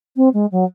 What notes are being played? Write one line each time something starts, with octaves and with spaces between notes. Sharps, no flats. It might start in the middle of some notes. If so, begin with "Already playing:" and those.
C4
G#3
F#3